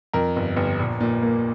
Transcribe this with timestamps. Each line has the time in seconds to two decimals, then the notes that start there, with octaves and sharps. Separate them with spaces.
0.13 F2 A#4
0.36 G1
0.56 G1
0.79 A#1
1.00 A#2
1.22 A#3